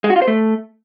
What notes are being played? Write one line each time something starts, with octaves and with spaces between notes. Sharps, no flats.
G#3
F#4
F4
C5
A3